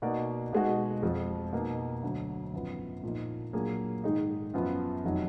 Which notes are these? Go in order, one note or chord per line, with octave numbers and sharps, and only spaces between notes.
B2 A#3 D#4 F#4 D5
B2 G#3 D#4 F#4
F2 F3 G#3
B2 A#3 D#4
D2 D3 F#3
G#1 F#2 F3 B3 F4
A#2 F3 A#3 D#4
A#2 F#3 A#3 D4 G#4
G#2 D#3 G#3 D#4
F#2 F3 B3 F4
F1 D#3 F#3